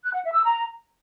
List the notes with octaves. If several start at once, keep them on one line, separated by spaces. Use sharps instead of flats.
F#6
F#5
E5
E6
A#5